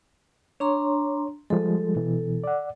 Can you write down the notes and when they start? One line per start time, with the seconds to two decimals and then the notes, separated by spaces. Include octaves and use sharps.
0.60 D4 C#5 A#5 C6
1.50 F3 G3 G#3 A4
1.96 B2 E3
2.44 D5 F#5